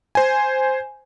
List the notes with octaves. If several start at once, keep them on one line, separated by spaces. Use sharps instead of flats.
C5 G#5